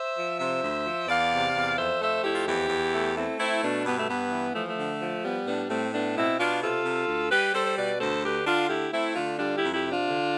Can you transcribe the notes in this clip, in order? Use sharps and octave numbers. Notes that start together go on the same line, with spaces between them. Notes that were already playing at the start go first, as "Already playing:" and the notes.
Already playing: C5 E5
F3
C3 C5 E5
D2
F3
E2 D5 F5
C3
E2
F2 C5 E5
A3 C5 E5
F2 E4 G4
F4
E2 E4 G4
E2
A3
A3 C4 E4
A3 C4 E4
B2 B3 D4
G2 B3
A3
G2 B3
E3
F3 A3
A3
D3
F3
G3 B3
A2 B3 D4
A2 A3 C4
A3 B3 D4
B2 C4 E4
B2 D4 F4
C3 F4 A4
C3
D2
G3 G4 B4
G3 A4 C5
C5
B2 B4 D5
D2 A4 C5
D3 G4 B4
D3 D4 F4
A3 E4 G4
A3 C4 E4
D3 D4 F4
G3 D4 F4
E4 G4
F2
E4 G4
C3
D4 F4
D3